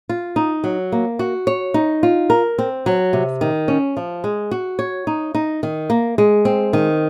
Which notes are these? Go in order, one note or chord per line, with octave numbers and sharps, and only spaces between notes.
F4
D#4
F#3
A#3
F#4
C#5
D#4
F4
A#4
C4
F#3
C3
D#3
C#4
F3
G#3
F#4
C#5
D#4
D#4
D#3
A#3
G#3
C4
D#3